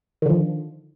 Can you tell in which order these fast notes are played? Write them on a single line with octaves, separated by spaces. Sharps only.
D#3 D3 F3